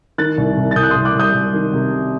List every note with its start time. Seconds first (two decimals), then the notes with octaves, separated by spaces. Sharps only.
0.18 D#3 F#6 A6
0.38 C2
0.57 C2
0.71 A6
0.76 C2 D#6 G6
0.83 F#6
0.91 C2 C6 D#6
1.05 D6 F#6
1.15 C2 D#6 G6
1.34 C2
1.53 D#3
1.73 C3